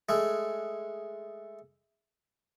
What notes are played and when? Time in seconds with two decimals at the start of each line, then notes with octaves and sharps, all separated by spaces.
0.09 G#3 A3